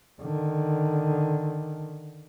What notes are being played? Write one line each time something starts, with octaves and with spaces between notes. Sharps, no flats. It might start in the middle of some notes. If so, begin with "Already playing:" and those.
D3 D#3